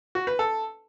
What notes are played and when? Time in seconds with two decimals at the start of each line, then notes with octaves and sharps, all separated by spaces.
0.15 F#4
0.27 B4
0.39 A4